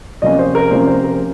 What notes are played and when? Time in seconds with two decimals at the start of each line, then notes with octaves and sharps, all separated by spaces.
0.22 C3 F3 A#3 C#4 D#5
0.39 C5
0.55 A#4
0.71 C3 F3 A#3 C#4 C5
0.87 C5
1.04 A#4